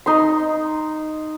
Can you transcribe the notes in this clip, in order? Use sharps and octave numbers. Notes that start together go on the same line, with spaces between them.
D#4 C6